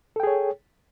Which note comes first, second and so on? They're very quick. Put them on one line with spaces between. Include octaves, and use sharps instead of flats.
A4 G5 G#4 C#5